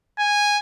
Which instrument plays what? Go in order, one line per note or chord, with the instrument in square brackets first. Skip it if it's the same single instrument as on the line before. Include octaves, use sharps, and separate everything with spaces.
[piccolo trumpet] G#5